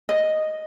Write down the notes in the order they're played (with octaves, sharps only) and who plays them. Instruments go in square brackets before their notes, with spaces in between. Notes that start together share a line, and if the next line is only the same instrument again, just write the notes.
[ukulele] D#5